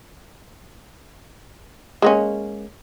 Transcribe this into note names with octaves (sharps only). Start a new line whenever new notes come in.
G#3 A#3 C#4